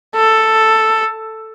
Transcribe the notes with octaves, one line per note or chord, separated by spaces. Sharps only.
A4